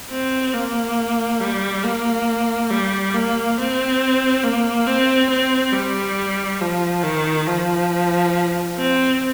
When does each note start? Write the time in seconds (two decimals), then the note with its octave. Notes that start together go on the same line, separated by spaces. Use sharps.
0.11 C4
0.54 A#3
1.40 G3
1.84 A#3
2.71 G3
3.14 A#3
3.57 C4
4.44 A#3
4.87 C4
5.30 C4
5.73 G3
6.60 F3
7.03 D#3
7.47 F3
8.78 C4